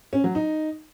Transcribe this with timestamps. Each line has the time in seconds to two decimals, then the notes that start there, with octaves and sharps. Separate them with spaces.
0.13 C#4
0.24 F#3
0.35 D#4